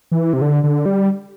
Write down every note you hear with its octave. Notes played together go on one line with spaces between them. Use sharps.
E3
C3
D3
D3
G3